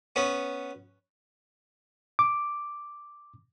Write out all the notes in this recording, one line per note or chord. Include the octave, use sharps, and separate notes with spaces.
B3 C#4
D6